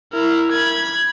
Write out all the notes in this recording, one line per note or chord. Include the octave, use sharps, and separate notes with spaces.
E4 A#4
B5 G#6